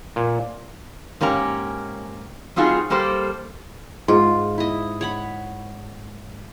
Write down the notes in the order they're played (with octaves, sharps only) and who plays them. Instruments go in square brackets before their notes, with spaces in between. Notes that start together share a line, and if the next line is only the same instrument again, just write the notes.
[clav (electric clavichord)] A#2
[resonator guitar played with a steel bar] G#2 A#3 C#4 G4 A#5
G3 C4 D#4 F4 F#4 G#4
G3 A#3 G4 A4 C5
[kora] G#2 [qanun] F4
[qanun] E4 D#5
C#5 F#5 B5